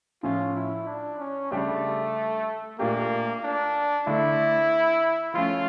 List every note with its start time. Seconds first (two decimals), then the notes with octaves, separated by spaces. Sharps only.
0.23 A2 F3 C#4 F4
0.56 E4
0.87 D4
1.20 C#4
1.51 C#3 G3 A3 D4 G4
2.79 A#2 A3 A#3 D4 G4
3.43 D4
4.07 D3 A3 D4 E4 A4
5.34 F3 A3 C#4 F4